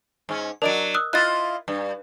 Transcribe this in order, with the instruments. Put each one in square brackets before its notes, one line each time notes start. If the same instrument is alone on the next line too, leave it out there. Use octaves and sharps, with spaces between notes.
[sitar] G#2 C#4
[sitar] F#3 D4 [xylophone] A#4 D#5 D7
[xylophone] D#6 E6 F#6
[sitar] E4 F4 D#5 [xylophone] F#6 A6
[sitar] G2